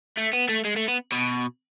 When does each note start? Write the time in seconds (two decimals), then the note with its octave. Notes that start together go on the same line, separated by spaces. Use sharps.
0.17 A3
0.33 B3
0.49 A3
0.64 G#3
0.76 A3
0.88 B3
1.12 B2